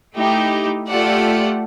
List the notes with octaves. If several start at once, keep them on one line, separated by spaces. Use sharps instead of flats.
A3 D#4 E4 G4
A3 F4 G4 A4 D5 F#5